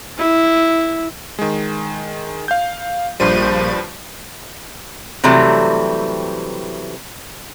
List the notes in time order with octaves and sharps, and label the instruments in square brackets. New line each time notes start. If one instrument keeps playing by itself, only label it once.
[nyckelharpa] E4
[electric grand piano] D#3 G#3
F5 G6
[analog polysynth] A#1 C5 D#7 [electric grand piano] G2 F3 G3
[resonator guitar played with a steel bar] C3 E3 F#3 G3 A3